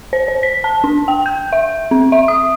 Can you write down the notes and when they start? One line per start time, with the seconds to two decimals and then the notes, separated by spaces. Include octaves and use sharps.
0.13 C5
0.28 C5
0.43 B6
0.64 A5
0.84 D4
1.08 G5
1.26 G6
1.53 E5
1.91 C4
2.12 E5
2.28 D#6